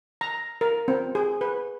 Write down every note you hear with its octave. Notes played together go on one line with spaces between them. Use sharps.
A#5
A#4
C4
G#4
B4